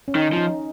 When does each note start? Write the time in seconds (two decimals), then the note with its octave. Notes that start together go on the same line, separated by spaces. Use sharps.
0.08 C#4
0.15 D#3 D#4
0.33 F3 D#4